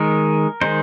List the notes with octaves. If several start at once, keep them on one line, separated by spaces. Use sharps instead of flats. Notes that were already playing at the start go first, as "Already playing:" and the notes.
Already playing: D#3 G#3 D#4 A#4
D#3 G#3 D#4 C5